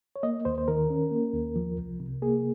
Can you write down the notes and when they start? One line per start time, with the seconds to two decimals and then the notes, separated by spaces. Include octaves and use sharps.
0.16 C#5
0.23 A#3 D#5
0.45 D#2 C5
0.58 C5
0.68 D#3 A#4
0.90 C#4
1.11 A#3
1.34 D#2
1.56 F3
1.78 C2
2.00 C3
2.22 A#3 G#4